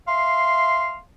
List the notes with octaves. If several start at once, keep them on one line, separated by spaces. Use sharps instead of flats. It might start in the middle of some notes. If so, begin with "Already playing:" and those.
E5 F5 C6